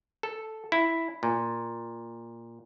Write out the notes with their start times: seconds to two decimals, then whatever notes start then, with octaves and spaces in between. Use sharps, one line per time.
0.23 A4
0.72 E4
1.23 A#2